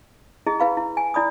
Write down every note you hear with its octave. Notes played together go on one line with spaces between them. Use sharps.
E4 G#4 D#5
E4 B4 F5 B5
E4
G#5
E4 D5 B5 D#6